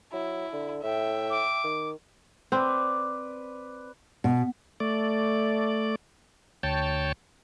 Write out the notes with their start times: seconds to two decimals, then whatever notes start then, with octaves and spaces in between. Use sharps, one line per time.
0.13 F#3 E4
0.52 D3
0.83 A2 E5 G5
1.30 D6
1.64 D#3
2.52 C4 B4 D5
4.24 B2
4.80 A3 D5
6.63 D2 C#5 G5 A5